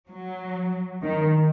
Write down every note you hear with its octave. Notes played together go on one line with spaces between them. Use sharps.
F#3
D#3